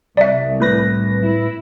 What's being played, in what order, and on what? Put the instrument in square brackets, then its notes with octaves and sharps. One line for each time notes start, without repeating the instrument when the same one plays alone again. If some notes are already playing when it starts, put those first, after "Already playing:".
[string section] C2 [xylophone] D5 E5
[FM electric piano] A2 B4 A#6
[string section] E4